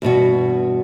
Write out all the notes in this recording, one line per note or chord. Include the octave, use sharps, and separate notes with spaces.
E2 G2 B2 F#4